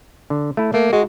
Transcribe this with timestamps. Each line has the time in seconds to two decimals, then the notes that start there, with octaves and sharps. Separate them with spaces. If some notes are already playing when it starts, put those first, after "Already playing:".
0.30 D3
0.57 A3 E4
0.74 A3 A#3
0.93 G#3 F#4